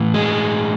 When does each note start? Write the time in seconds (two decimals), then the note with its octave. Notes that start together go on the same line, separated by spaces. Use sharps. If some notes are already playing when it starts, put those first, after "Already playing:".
Already playing: A2 E3
0.14 G#3